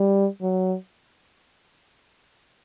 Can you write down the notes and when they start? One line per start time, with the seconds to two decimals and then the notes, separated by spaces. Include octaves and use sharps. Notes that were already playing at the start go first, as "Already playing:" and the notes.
Already playing: G3
0.42 F#3